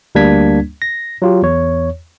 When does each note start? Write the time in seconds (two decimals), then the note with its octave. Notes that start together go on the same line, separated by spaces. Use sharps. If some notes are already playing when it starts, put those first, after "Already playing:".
0.15 D2 G3 A#3 D4 G#6 B6
0.82 A#6
1.22 F#3 F4 G4
1.42 E2 C#5